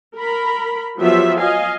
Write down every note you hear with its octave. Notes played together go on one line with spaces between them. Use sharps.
A#4 B5
F3 F#3 B3 F4 G4 E5
D#5 F5 G#5